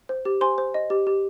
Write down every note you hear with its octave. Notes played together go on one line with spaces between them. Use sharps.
C5
G4
C5 G#5 C6
C5
D#5
G4
G4